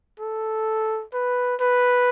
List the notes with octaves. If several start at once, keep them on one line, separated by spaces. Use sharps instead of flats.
A4
B4
B4